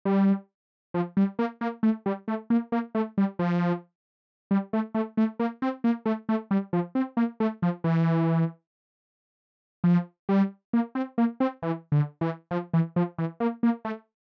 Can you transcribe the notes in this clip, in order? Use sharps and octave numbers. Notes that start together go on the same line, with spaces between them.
G3
F3
G3
A#3
A#3
A3
G3
A3
A#3
A#3
A3
G3
F3
G3
A3
A3
A3
A#3
C4
A#3
A3
A3
G3
F3
C4
A#3
A3
F3
E3
F3
G3
A#3
C4
A#3
C4
E3
D3
E3
F3
E3
F3
E3
A#3
A#3
A3